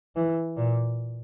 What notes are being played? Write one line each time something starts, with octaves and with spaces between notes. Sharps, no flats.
E3
A#2